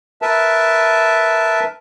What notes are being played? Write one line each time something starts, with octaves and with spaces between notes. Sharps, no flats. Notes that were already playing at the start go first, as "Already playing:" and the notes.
A#4 B4 E5 A5